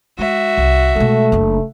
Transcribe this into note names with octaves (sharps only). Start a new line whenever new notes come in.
G#3 F#4 E5
C2
B2 G#3 A3
F#1 D4